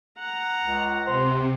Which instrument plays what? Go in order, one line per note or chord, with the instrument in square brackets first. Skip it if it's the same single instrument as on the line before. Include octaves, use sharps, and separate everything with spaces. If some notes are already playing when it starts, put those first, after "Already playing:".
[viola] F#5 A#5
[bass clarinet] C#2
[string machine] C3 [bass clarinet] C5